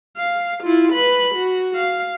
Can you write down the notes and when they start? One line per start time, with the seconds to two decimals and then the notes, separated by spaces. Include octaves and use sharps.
0.17 F5
0.63 E4 F4
0.93 B4 B5
1.35 F#4
1.76 F5